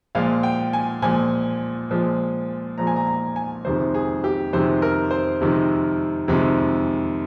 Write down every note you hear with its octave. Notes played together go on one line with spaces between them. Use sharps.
A#2 F3 G#3 F5
G5
G#5
A#2 F3 G#3 G#5
A#2 F3 G#3
A#2 F3 G#3 A#5
G#5
A#5
A#5
G#5
F2 C3 D#3 G#3 C5
G#4
G4
F2 C3 D#3 G#3 C5
A#4
C5
F2 C3 D#3 G#3
F2 C3 D#3 G#3